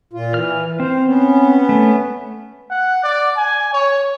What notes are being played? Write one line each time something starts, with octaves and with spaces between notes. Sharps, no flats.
A#2 F4
E3 F6
C4 C5
B3 C#4
A3
F#5
D5
G#5
C#5